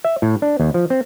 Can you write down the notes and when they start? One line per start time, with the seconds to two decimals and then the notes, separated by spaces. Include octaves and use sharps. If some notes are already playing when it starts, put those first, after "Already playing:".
0.05 E5
0.22 A2
0.42 D4
0.60 D#2
0.74 F3
0.90 C4